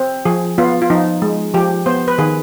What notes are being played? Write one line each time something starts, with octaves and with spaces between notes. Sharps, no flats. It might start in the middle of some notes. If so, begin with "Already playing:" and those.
Already playing: C4
F3 G#4
B3 F4
F4
F3 D#4
G#3
F3 G4
B3 C5
B4
D#3 G#4